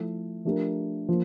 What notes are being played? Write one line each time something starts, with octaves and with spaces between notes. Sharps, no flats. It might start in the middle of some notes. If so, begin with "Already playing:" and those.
Already playing: F3 A3 E4 A4
F3 A3 D4 G4 A#4
F3 A#3